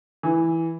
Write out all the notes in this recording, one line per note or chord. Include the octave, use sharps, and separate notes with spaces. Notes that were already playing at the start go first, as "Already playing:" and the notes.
E3